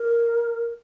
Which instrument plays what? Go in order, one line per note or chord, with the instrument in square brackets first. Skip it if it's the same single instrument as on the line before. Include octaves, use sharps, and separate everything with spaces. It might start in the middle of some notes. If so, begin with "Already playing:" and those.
Already playing: [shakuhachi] A#4